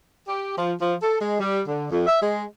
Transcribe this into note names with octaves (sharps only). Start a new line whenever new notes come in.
G4
F3
F3
A4
G#3
G3
D3
F2
E5
G#3